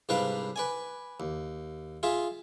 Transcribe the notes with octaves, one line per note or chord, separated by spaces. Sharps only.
C2 G#2 D4 B4 D5 F5
B4 D5 G#5
D#2
F4 G#4 E5